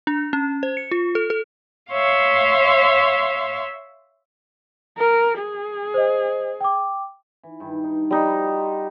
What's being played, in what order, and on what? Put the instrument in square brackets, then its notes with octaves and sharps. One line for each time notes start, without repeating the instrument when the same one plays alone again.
[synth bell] D4
C#4
C5
C#7
F4
A4
A4
[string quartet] C#5 E5 F5 C6
[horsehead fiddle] A#4
G#4
[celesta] C5 D#5
G5 D6
[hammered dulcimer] E3
G2 D#3
D#4
[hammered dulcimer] F3 G5 B5 [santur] G3 D#4
[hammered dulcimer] F#4
C5